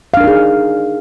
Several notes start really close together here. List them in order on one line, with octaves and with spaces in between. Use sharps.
F5 D4 A#4 D#4 G#4